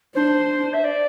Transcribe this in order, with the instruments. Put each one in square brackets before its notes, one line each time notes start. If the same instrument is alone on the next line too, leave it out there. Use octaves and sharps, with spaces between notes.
[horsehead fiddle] D4 [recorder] C5
[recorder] E5
D5